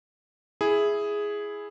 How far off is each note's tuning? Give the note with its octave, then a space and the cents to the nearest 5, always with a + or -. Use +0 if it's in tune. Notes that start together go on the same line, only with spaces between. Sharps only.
E4 +0 G#4 +0